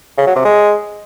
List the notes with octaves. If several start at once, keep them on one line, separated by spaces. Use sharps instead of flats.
C#3
F#3
C3
G#3